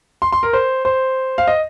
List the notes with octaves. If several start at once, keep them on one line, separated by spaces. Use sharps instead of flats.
C6
C6
A#4
C5
C5
F5
D#5